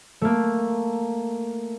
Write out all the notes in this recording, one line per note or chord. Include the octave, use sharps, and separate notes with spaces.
A3 A#3